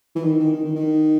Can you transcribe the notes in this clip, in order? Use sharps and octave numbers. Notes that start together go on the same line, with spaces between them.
E3
D#3
D#3
D#3
D#3
D#3